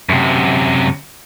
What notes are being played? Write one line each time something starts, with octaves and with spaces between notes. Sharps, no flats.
F#2 C3